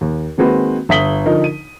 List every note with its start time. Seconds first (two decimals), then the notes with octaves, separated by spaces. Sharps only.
0.01 D#2
0.38 D#3 G#3 A#3 C4 F#4 B4
0.89 G1 E5 D#6 B6 F#7 G7
1.25 D3 F3 D#4 A#4
1.44 D#7